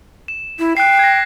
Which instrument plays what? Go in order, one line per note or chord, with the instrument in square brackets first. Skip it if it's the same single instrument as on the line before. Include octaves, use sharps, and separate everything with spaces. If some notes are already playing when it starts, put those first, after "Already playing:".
[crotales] E7
[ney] E4
[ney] G5 [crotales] F#6 C7
[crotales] G#6 A#6